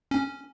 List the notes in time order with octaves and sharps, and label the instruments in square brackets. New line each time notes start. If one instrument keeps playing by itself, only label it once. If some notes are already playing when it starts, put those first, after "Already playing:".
[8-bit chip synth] C#4